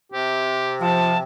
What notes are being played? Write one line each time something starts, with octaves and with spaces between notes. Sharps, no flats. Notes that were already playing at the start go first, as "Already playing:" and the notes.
C3 C4 G4
F3 A5